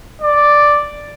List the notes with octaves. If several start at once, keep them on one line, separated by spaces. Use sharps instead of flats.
D5